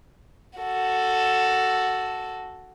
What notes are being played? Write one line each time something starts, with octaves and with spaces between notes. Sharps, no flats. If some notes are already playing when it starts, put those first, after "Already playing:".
F#4 A4